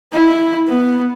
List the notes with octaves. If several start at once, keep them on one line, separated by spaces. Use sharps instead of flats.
E4
B3